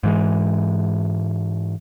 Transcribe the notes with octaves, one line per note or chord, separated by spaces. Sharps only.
G#2 E3 G#3